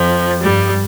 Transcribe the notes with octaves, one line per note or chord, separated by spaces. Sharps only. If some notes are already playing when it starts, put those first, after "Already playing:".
Already playing: F2 F3
G2 G3